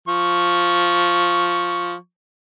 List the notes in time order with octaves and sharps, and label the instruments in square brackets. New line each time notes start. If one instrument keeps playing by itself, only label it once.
[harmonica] F3 C#6